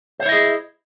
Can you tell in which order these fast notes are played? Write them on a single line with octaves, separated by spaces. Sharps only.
C5 C#5 E4 D#5 G#4